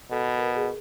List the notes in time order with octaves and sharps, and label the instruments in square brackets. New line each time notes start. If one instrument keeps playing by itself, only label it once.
[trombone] B2 [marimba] A4
[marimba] A#4
G#4